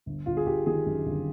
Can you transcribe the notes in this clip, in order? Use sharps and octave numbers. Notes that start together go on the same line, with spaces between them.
G1
G1 F4
G#4
G1 G4
D#3 G#4
F#2
G1